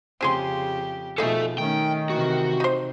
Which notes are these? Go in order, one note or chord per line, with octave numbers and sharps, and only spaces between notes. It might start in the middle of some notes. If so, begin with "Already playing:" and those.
F2 C#3 C4 G4 G#4 C6
B2 F3 D#4 G#4 A4 E5
D#3 A3 C#4 G5
C3 E3 F#4
D#4 C5